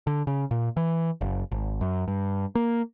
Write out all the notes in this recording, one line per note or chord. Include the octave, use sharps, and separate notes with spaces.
D3
C#3
A#2
E3
F#1
G#1
F#2
G2
A#3